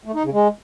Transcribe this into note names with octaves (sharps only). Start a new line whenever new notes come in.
A3
D#4
C#3
G#3